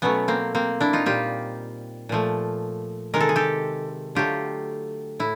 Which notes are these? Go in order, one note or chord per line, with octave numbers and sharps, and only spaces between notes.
B2 F#3 A3 B3 C#4
A#3 C4
A#3 C4
D4 E4
D#4 F4
A#2 G3 F4 G4
A#2 F3 A3
C3 D#3 G#3 A#4
A4
G#4
G4 A4
D3 F#3 A3 F4 G4
A2 E4